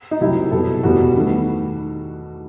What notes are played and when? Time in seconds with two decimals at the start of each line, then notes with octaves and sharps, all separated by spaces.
0.11 D#4
0.20 C2 C3 F#3 E4
0.52 B2 G3 B3 A4
0.83 E2 B2 G3 B3 F#4
1.17 D#3 A3